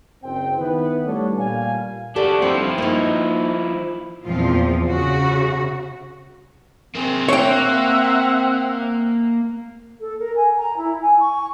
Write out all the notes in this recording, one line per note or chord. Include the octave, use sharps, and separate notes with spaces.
F#1 C4 G5
D#3 B3 E4 B4
G3 A3 B3 D4 A4 C#5
A#2 G3 F5 G#5
D4 F#4 G4 A4 D5
F3 C4 E4
A#3 D#4
E2 A#2 F3 C4 F4
C#3 F#4
A#3 C4 G#4
A#3 C#5 E5 F#5 G5
A4
A#4
G#5
A#5
E4
G#5
C#6